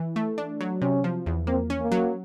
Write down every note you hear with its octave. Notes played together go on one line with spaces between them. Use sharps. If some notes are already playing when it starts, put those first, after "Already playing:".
Already playing: E3
A3
D4
F#3
C3 C#4
F3
E2
A#3 C4
C#4
A#3
F#3